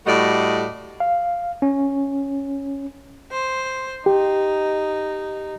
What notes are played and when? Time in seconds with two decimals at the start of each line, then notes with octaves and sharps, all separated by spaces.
0.07 A2 G3 A3 F#4 D5 D#5
1.00 F5
1.62 C#4
3.31 C5
4.06 D#4 G4